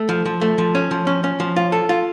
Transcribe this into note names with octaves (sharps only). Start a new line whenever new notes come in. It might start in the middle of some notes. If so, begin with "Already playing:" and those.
Already playing: A3
F3
F3
A3
F3
C#4
F3
C#4
C#4
F3
F4
A4
F4